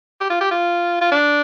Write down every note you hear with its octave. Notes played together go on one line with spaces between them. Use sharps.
G4
F4
G4
F4
F4
D4